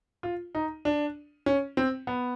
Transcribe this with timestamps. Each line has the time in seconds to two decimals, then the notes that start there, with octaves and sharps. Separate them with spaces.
0.23 F4
0.55 D#4
0.85 D4
1.46 C#4
1.77 C4
2.07 B3